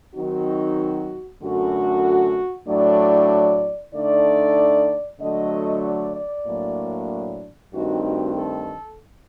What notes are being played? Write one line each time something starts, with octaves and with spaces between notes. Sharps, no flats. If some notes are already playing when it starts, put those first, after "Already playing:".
D#3 F#3 C4 D#4 F#4
F#2 D3 A3 F#4
A2 F#3 A3 D4 D5
D3 A3 D#4 D5
D3 F#3 A3 D#5
D5
D5
A2 F#3 A#3 D4
G2 D#3 A3 C4 D#4 F#4
F#4
A4